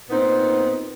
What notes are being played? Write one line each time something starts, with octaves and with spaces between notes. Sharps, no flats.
A#2 B3 C4 D#4